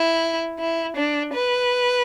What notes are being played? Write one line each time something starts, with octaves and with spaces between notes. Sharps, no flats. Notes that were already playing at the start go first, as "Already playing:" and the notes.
Already playing: E4
E4
D4
B4